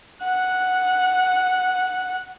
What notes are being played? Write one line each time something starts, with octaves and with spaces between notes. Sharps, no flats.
F#5 F#6